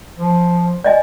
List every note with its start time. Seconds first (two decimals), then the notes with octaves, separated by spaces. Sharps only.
0.17 F3
0.84 D5 D#5 G#5